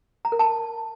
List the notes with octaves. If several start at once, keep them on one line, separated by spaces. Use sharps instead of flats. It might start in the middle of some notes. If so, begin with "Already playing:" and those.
A#5
A#4
A5